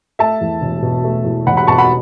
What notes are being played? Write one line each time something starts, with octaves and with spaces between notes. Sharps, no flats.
A3 E5 A5
E2
E1
B2
A3
E2
E1 F#5 B5
F#5 B5
B2 A5 C#6
F#5 B5